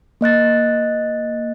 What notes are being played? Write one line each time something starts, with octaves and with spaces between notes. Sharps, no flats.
A#3 D#5 F#6 A6